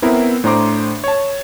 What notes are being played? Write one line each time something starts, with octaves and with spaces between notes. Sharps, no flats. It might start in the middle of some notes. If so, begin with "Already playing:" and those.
B3 C4 E4 A#4
A2 D4 C5 A#5 C6 D6
C#5 A5